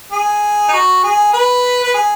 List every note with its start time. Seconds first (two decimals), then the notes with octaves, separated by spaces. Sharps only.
0.12 G#4
0.68 D#4
0.73 F#4
1.04 G#4
1.33 B4
1.83 B4
1.94 G#4